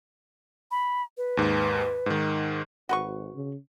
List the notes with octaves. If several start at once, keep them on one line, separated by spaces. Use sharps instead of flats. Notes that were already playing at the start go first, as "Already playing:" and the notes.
B5
B4
D#2 G#2
G#2 D#3
G#1 F#4 B4 C#6
C#3